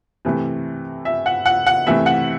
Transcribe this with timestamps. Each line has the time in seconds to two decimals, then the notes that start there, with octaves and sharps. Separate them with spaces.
0.25 C3 E3 A3
1.05 E5
1.26 F#5
1.46 F#5
1.67 F#5
1.87 C3 E3 A3 E5
2.06 F#5